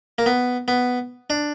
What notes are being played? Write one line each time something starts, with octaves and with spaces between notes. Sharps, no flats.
A#3
B3
B3
D4